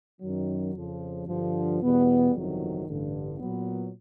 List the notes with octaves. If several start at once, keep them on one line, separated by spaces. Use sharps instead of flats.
F#2 D#3 F#3
F2 C#3 F3
G2 D3 F3
E2 B2 G3 B3
G1 F2 C3 D#3 F#3
A1 G2 D3
A#2 F#3 B3